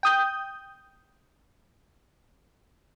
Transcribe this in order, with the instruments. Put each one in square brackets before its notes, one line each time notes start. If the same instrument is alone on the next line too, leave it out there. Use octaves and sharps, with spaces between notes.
[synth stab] G5 D#6 G6